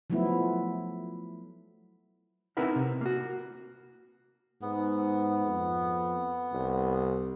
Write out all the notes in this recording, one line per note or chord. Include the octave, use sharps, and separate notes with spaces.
F3 F#3 A3 B3 E4
C4 D#4 E4 A#4 B4 F#5
C3
A#3 F#4
G#2 B3
F2
C2